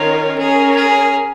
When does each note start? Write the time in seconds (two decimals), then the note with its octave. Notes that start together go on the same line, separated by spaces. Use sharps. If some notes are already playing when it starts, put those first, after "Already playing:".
Already playing: D#3 C#4 F4 A#4 C#5
0.38 C#4 G#4 A#4 C#5
0.76 G#4